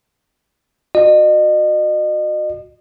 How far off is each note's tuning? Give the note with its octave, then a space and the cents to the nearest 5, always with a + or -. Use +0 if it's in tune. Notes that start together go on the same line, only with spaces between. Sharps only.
F#4 -25 D#5 -35